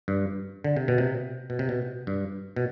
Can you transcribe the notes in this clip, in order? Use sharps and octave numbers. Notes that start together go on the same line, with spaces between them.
G2
D3
C3
B2
C3
B2
C3
B2
G2
B2